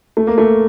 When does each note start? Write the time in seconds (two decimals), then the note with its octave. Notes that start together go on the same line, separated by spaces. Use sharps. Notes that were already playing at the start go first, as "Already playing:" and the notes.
0.17 A3
0.27 A#3
0.38 A3